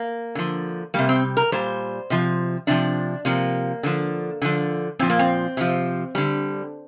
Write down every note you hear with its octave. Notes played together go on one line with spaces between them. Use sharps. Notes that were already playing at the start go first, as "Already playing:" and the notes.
Already playing: A#3
D3 F3
C3 G3 A#3
C4
A#4
A#2 G3 C5
C3 F3
C3 F3 D4
C3 F3 A#3
D3 F3
D3 F3
A#2 F3 C4
A#3
C4
C3 F3
D3 G3